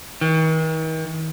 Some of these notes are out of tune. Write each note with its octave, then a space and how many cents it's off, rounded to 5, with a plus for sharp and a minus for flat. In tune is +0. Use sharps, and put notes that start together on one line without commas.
D#3 +45